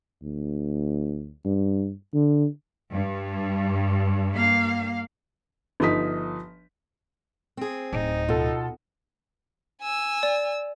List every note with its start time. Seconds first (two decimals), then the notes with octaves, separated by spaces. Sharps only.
0.23 D2
1.45 G2
2.14 D3
2.91 G2
4.33 A#3 F5
5.80 G1 F3 D#4 D#6 B6
7.57 C4 G#4
7.93 D1 D#4
8.28 B2 F4 A4
9.82 G#5 E6
10.23 D5